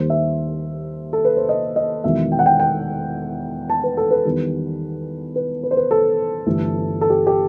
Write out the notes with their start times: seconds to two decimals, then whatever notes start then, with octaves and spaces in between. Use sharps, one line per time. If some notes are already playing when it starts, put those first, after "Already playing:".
Already playing: D#2 D#3 G3 C5
0.10 E5
1.13 A4
1.25 B4
1.37 C5
1.49 D#5
1.76 D#5
2.04 E1 E2 D#3 F#3 E5
2.32 G5
2.39 F#5
2.46 G5
2.60 G5
3.70 A5
3.84 B4
3.97 A4
4.11 B4
4.25 E2 D#3 G3
5.36 B4
5.63 B4
5.71 C5
5.77 B4
5.91 A4
6.46 G1 G2 E3 A3
7.01 A4
7.10 G4
7.27 G4